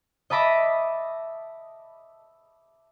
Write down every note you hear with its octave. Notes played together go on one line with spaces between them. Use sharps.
D#5 E5 A5 B5 D6 A#6